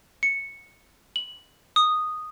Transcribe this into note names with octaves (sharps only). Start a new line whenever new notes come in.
C#7
F#7
D#6